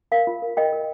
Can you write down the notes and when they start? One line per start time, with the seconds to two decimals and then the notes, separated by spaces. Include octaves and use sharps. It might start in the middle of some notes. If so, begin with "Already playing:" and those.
0.12 A#4 F5
0.27 F4
0.42 A#4
0.57 A#4 D#5 G5
0.72 A#4